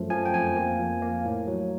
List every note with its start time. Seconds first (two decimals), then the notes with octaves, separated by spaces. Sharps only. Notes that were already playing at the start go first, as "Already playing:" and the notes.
Already playing: F#2 F3 A3
0.10 F3 G#5
0.25 G5
0.34 F2 G#5
0.56 A#3
0.79 F3
1.02 A#3
1.25 A2
1.47 F#3